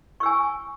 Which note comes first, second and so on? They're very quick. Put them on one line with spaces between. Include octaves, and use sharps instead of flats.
C#6 E6 G#5